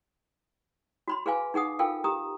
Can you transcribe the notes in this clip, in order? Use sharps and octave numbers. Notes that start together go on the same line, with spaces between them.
F#4 B5 C6
G#4 B4 F5 G#5
D#4 G#4 F#5 D#6
F4 A4 A#4 F5 G5
G4 A#5 D#6